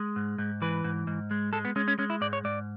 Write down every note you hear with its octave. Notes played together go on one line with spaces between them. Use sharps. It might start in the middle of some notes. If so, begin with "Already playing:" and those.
Already playing: G#3
G#2
G#2
E3 B4
G#2
G#2
G#3
G#3 A4
B3
G#3 C#4
C#4
G#3 C#4
E4
G#2 D5
C#5
G#2 D5